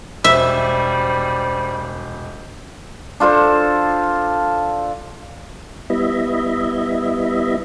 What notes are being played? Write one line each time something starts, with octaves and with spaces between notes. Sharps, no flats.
E1 G3 C5 E5
D4 F4 A4 C5
G3 B3 E4 D#5 E5